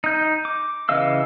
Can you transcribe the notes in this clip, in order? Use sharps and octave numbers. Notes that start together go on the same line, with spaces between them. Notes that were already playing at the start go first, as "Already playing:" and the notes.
D#4 G6
D6
C#3 E3 D#5 F5 E6